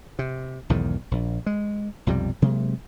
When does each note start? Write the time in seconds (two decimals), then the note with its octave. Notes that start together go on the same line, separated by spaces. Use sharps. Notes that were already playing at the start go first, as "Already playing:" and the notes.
0.19 C3
0.70 B1 E2 G#2 D#3
1.11 A#1
1.46 G#3
2.07 B1 F2 C3 G3
2.42 C3 F#3 G#3 A#3